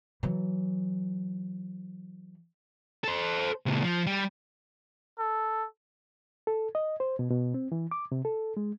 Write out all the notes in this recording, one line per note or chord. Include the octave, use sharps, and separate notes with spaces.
E3 F#3
A4 C5
C#2 A#2
F3
G3
A4
A4
D#5
C5
B2
B2
C4
E3
D6
C3
A4
G#3